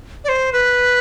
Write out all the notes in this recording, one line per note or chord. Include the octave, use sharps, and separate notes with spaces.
D5
C5
B4